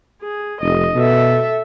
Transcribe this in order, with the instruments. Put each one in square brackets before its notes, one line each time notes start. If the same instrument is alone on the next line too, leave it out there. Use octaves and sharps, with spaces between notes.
[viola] G#4
[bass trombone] F1 [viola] D#5
[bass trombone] B2 [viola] A4 E5